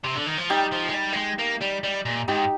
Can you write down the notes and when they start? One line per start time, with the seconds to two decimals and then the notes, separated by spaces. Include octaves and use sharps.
0.04 C3
0.16 D3
0.27 D#3
0.38 F3
0.50 G3 D#4 G4
0.72 F3
0.89 G#3
0.94 G3
1.13 A#3
1.16 G#3
1.39 A#3
1.61 G3
1.84 G3
2.05 A#2
2.28 G#2 D#4 G4